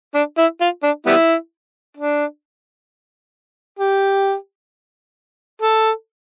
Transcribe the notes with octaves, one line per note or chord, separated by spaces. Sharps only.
D4
E4
F4
D4
G3 B3 E4
D4
G4
A4